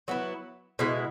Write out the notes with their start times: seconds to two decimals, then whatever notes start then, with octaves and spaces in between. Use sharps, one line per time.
0.08 F#3 B3 E4
0.79 B2 G#3 E4